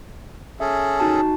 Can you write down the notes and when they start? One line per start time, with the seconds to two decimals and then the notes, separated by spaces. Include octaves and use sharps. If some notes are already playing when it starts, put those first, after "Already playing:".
0.60 C#4 G#4 A4 E5
1.00 D#4 F#4 A5